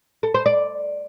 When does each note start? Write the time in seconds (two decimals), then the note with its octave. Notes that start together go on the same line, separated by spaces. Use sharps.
0.23 A4
0.34 C5
0.46 D5